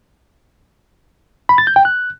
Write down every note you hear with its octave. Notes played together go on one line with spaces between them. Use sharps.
B5
A6
G6
G5
F#6